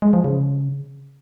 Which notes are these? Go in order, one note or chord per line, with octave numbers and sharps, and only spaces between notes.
G#3
F3
C#3